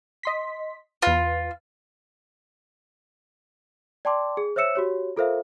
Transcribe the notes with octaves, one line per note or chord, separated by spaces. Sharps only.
D#5 C6 B6
E2 F4 B4
D5 G5 A5 C6 D6
G#4
C5 C#5 E5 E6 C#7 E7
F#4 G4 C#5
F4 A4 A#4 C5 E5 F5